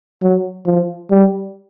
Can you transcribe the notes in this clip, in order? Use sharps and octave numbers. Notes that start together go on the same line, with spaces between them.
F#3
F3
G3